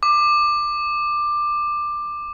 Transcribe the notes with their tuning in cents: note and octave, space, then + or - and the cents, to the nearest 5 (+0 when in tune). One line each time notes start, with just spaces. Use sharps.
D6 +15